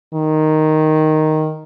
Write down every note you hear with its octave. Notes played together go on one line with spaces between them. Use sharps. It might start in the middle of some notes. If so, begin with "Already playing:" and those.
D#3